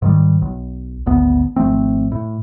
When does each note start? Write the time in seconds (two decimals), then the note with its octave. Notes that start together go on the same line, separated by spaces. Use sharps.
0.02 G#2 D#3 G3
0.42 B1
1.06 G#1 D2 B3
1.56 G#1 F3 A3 C4
2.12 A2